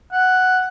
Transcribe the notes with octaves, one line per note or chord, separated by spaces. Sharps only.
F#5